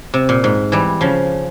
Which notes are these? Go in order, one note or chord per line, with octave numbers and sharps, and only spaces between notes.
C3
A#2
G#2
E3 G3
C#3 F3